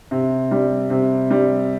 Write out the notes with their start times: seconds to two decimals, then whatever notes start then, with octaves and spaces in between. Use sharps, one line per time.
0.11 C3
0.51 G3
0.90 C3
1.31 G3